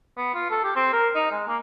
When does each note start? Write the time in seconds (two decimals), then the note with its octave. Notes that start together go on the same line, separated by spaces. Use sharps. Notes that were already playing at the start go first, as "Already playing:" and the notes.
0.17 B3
0.34 F4
0.50 A4
0.64 G4
0.76 C4
0.93 A#4
1.15 D#4
1.31 G#3
1.48 A#3